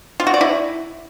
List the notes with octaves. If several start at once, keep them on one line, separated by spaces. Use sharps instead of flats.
F4
F#4
D5
E4